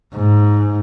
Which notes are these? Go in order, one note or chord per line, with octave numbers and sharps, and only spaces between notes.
G#2